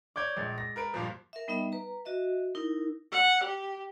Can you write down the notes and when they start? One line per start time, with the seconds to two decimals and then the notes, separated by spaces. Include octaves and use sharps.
0.16 C#5 D5 D6 G6 G#6
0.37 A#1 G#3 A6
0.58 A#6
0.76 A#4 B4 D7
0.94 G2 A#2 F3
1.33 A#4 E5
1.48 G3 B3 D#4 D#5 E5
1.72 B4 A#5
2.05 F#4 D#5 E5
2.55 D#4 E4 A#4
3.12 F#5
3.44 G4